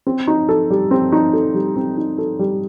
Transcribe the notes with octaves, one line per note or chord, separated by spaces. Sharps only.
C4
D#4
A4
G3
C4
D#4
A4
G3
C4
D#4
A4
G3